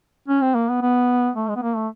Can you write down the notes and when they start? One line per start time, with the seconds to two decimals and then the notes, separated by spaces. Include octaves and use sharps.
0.28 C#4
0.41 C4
0.55 A#3
0.69 B3
0.82 B3
1.35 A3
1.49 G#3
1.56 B3
1.62 A#3
1.76 A3